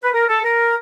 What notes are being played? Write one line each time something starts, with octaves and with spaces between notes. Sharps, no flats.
B4
A#4
A4
A#4